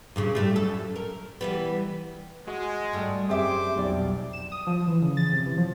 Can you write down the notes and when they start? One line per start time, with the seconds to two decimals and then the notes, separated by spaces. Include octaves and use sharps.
0.16 G2 A#2 C#3
0.35 A2 G3 A3
0.56 F#2 A4
0.96 A#4
1.41 E3 G3 B3
2.47 G#3 F#4
2.93 G#2 G3 A3
3.30 F#2 C4 G4 G#4 C5 E5 D6
3.78 B1 F2 G3 D5
4.33 E7
4.52 D#6
4.67 F3
4.87 E3
5.02 C#3
5.17 A6
5.33 C3
5.46 E3
5.57 F3